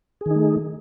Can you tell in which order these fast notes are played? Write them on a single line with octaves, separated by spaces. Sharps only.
G#4 D#3 D#4 A3